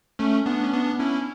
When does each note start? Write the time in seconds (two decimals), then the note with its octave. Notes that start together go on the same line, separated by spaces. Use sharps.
0.19 A3 C#4
0.46 B3 D4
0.63 C#4
0.72 B3 D4
0.99 C#4 E4